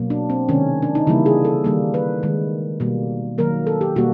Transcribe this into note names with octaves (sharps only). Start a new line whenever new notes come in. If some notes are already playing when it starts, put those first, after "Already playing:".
Already playing: B2 F#3 A#3
D4
C4
C3 D#3 G#3 C#4
D4
D#4
C#3 E3 G3 A#3 E4
G#4
A4
D#3 G3 A#3
B4
D#3 G#3
B2 G3 A#3
D#3 F#3 A#3 A#4
A4
G4
B2 G3 A#3 F#4